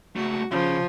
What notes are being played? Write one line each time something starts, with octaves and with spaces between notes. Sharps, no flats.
C#2 A3 F#4
C#3 F3 C#4